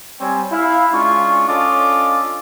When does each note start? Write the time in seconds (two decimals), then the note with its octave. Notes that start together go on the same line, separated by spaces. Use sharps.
0.21 G3 C4 C#5 G5 G#5
0.52 E4 F5
0.94 G#3 C#4 D4 F4 C#6
1.48 C#4 D4 F4 A4 D#5 D6